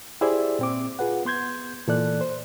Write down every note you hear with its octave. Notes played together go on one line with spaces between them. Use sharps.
E4 G4 G#4 C5 D5 E5
A#2 C4 D6
F4 G#4 B4 F#5
B3 C6 G6 G#6
A#2 E3 A4 D5 F#6
C5